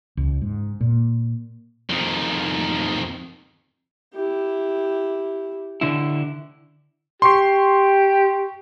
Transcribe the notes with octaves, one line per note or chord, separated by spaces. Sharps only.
C#2
G#2
A#2
F2 D#3
E4 G4
D3 E4
G4 C6 C#6 C7